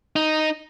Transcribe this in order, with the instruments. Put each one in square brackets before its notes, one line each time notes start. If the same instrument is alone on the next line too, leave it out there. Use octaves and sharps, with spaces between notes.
[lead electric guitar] D#4